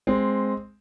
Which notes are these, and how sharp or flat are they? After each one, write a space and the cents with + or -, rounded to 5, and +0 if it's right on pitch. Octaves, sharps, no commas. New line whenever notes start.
G#3 +0 C4 +0